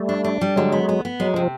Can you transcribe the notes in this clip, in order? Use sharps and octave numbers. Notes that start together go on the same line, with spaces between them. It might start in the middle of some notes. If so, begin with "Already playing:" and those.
Already playing: G3 A3
D4
D4
G3
D3 F#3 G#3
B3
B3
B3
F#3 G#3
C3 F3